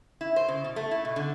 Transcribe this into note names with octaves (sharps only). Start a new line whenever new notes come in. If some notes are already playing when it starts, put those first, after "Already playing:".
E4
C5
C#3
B2
A3
E4
B2
D3